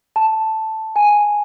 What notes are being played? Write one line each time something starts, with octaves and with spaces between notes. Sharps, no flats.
A5
G#5